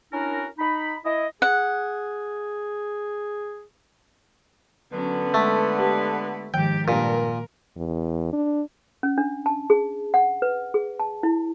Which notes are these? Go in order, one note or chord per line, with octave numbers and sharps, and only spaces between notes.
C#4 D4 E4 F#4 A#4
D#4 B5
E4 D#5
G#4 F#5
D3 F#3 B3 C#4
G#3 A3
G#3 G4 B4
G#2 D#3 F3 G4 G5
G2 A#2 A#4
E2
D4
C#4
D4
A5
G#4
F#5
B4
G#4
A5
E4